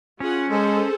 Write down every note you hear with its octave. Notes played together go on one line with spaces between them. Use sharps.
C#4 F4 G#4 F#5
G#3 G#4 A4 C5